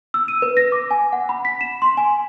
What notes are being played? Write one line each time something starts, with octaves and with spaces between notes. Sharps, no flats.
E6
D#7
B4
A#6
D6
G#5
F#5
B5
B6
E7
C6
G#5